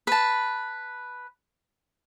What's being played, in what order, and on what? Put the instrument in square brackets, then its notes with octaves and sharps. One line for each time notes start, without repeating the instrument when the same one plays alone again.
[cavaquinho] B4 A5